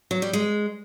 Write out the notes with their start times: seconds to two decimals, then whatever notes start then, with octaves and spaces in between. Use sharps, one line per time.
0.11 F#3
0.22 G3
0.33 G#3